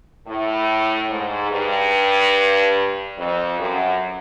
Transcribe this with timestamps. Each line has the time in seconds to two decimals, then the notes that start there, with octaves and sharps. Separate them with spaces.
0.27 A2
1.10 G#2
1.51 G2
3.18 F2
3.59 F#2